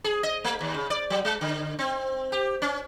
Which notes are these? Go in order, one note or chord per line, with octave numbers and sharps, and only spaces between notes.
G#4
D#5
A3
D#2
C#3
D5
F#3
G#3
D3
C4
G4
C#4